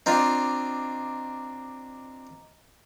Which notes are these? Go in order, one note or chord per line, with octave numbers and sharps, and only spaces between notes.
C4 D4 F4 D#5 A#5 D6